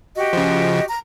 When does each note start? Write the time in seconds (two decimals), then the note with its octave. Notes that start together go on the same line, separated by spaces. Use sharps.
0.16 F#4 G4 D#5
0.33 C#3 F3
0.87 A#5